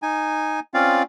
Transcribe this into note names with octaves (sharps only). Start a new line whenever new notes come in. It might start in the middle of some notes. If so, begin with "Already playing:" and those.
D#4 G#5
C4 C#4 F4 D5 F5